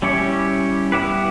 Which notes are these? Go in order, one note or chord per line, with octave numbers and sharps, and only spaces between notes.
G3 C#4 E4 G4 C#5
G3 B3 E4 G4 B4